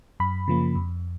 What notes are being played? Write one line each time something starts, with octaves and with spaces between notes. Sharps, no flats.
F#2 B5
C#3 F3 A#3
F2